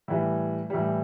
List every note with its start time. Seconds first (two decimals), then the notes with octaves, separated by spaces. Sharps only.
0.08 A2 E3 G3
0.70 A2 E3 G3